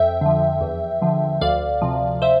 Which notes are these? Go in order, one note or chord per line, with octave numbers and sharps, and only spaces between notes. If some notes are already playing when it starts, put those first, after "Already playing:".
Already playing: F2 E5 G5
D3 F3
E2
D3 F3
D2 D5 F5
C3 F3
C5 E5